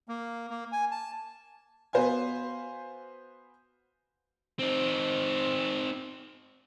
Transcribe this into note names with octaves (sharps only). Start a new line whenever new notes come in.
A#3
A#3
G#5
A5
B3 F#4 B4 C5 F5 G#5
C4 D#4